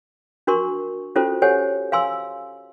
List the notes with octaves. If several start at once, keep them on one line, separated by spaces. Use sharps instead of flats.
D4 F#4 A#4 C6 C#6
C#4 F4 F#4 A4 C5
G4 A4 C5 C#5 F#5 G#5
F5 G#5 C6 E6